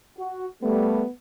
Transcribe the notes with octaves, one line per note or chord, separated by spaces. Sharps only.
F#4
G3 A3 B3